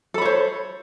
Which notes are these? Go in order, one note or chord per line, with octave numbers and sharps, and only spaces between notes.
A4 C5 C#5 B5